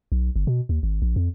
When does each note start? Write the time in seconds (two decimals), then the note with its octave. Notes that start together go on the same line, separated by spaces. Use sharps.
0.12 B1
0.36 G1
0.47 B2
0.69 D#2
0.83 G#1
1.02 A#1
1.16 F2